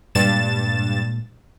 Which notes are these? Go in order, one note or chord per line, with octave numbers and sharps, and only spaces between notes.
G2 A#2 G#3 A6 E7